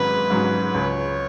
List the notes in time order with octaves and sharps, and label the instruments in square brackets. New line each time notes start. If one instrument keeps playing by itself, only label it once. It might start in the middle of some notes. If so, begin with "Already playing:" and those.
Already playing: [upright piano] G#1 G#2 F#3 C#4 [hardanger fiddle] B4
[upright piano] G#2 F#3 C#4
[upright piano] C#2 [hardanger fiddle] C#5